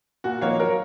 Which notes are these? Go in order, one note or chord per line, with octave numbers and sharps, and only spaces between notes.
A#2 F#4
F3 A#3 D#4 C#5 F5
F#3 A#4 C#5